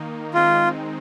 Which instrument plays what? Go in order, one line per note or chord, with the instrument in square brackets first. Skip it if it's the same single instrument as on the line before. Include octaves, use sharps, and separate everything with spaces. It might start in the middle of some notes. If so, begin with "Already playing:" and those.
Already playing: [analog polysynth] D#3 A#3 D#4
[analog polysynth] D#3 G#3 C4 D#4 [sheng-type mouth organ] F4